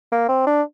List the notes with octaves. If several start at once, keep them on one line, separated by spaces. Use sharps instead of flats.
A#3
C4
D4